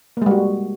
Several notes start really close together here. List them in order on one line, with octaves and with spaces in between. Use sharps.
A#3 G#3 G3 F#4